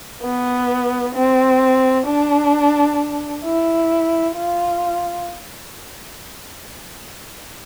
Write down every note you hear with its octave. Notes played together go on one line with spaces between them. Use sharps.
B3
C4
D4
E4
F4